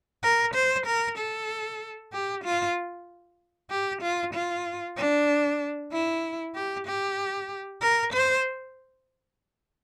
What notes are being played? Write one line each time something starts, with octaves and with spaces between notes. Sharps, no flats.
A#4
C5
A#4
A4
G4
F4
G4
F4
F4
D4
E4
G4
G4
A#4
C5